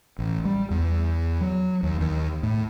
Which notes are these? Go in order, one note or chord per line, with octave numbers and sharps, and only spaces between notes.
A1
G3
E2
F#3
D#2
D#2
A2